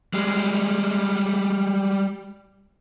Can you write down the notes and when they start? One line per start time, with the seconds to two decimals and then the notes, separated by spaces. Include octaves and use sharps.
0.14 G3 G#3